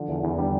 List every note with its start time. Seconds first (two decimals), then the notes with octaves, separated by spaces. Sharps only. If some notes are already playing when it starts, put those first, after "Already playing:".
Already playing: D3 F3
0.09 E2
0.23 E2 E3
0.38 D3 G3